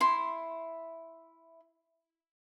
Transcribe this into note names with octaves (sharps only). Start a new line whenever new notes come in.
E4 C6